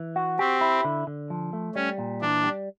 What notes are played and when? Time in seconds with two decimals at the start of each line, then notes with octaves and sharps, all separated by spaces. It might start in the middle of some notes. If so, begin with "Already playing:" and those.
Already playing: E3
0.16 F#4
0.39 C4 G4
0.61 E4
0.85 D3
1.07 D3
1.30 F3
1.53 A3
1.75 G3 C#4
1.99 A#2
2.22 E3 D4
2.44 G3